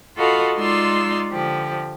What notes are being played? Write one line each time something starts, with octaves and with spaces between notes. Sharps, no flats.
F4 F#4 A4 D#5 F5 B5
G#3 D#4 F4 D5 C6 E6
D3 F3 G4